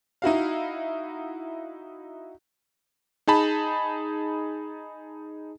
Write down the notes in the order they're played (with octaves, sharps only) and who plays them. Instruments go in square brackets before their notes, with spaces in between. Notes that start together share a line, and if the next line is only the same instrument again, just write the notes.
[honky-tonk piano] D#4 E4 F#4 F5
[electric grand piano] D#4 G#4 A5 B5